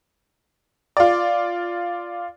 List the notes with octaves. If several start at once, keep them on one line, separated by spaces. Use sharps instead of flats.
F4 D5